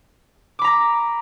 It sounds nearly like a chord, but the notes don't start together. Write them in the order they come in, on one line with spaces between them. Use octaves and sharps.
D6 B5 A#5 A#6